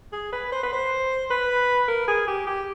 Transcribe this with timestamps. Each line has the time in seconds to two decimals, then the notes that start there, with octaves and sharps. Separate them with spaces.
0.12 G#4
0.33 B4
0.52 C5
0.63 B4
0.73 C5
1.30 B4
1.88 A#4
2.08 G#4
2.28 G4
2.47 G4